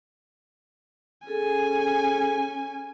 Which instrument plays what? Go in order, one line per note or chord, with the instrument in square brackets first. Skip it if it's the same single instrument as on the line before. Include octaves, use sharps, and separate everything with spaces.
[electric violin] C#4 G#5 [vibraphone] G#4 A4